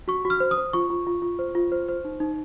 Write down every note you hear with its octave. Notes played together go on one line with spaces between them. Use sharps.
F#4 C#6
F#4
F6
C5
D#6
C5
F4 C#6
F4
F4
F4
C5
F4
C5
C5
D#4
D#4